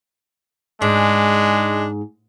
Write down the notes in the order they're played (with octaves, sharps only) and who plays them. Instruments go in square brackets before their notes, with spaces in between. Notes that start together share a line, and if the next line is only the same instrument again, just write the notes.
[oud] G#2 [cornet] G#3 [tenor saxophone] D4